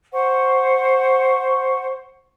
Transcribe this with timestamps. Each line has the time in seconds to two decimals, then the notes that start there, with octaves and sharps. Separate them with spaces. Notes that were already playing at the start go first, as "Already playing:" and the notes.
0.13 C5 F#5 C#6